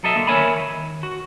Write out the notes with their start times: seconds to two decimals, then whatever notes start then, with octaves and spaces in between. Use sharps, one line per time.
0.03 B1 F#3 A4 D#5 E5
0.16 D3 A#3
0.27 D#3 A#4 C#5 E5 G#5 B5
0.59 D#3
1.03 F#4